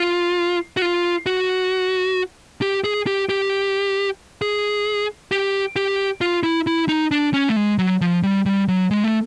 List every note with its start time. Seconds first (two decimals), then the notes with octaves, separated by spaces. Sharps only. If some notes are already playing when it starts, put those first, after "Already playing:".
Already playing: F4
0.77 F#4
0.82 F4
1.26 F#4
2.62 G4
2.84 G#4
3.07 G4
3.29 G4
4.42 G#4
5.32 G4
5.76 G4
6.21 F4
6.43 E4
6.67 E4
6.88 D#4
7.11 D4
7.33 C#4
7.49 A3
7.56 G#3
7.78 F#3
8.01 F3
8.23 G3
8.46 G3
8.68 F#3
8.91 G#3
9.04 A3